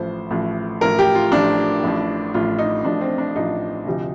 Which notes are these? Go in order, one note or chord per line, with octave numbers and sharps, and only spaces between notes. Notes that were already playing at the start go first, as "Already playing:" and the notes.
Already playing: A1 A2 F3 C5
A1 A2 F3
A1 A2 F3 A#4
G4
F4
A1 A2 F3 D4
A1 A2 F3
A1 A2 F3 F4
D#4
A1 A2 F3 D4
C4
D4
A1 A2 F3 D#4
D2 C3 F3